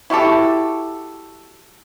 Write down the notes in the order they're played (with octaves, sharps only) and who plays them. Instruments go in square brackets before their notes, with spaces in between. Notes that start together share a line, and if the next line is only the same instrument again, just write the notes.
[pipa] E4 F#4 G4 A4